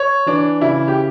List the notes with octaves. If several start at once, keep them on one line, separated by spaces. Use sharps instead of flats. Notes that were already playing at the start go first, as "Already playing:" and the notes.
Already playing: C#5
E3 D4
C#3 E4
G4